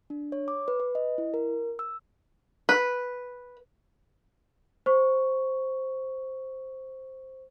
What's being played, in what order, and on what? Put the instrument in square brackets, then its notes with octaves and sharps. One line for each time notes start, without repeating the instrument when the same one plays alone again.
[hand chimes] D4
C#5
D6
B4
B4
D#5
E4
A#4
E6
[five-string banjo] B4
[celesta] C5 C#6